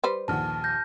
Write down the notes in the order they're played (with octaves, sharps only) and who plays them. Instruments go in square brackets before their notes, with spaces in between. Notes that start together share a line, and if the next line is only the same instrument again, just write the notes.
[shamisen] G3 B4 C5
[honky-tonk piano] A#1 D#2 F#5 [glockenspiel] A5 F6
[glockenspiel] G6 A#6